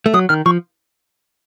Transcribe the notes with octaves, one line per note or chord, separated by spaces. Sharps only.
A3
F#3 D#6
D#3 F6
F3 C#6